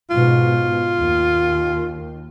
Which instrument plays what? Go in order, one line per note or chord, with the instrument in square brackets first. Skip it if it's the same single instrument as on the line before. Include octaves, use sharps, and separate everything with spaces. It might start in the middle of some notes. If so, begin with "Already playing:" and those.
[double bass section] G#2 B2 [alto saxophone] F4
[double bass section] D#2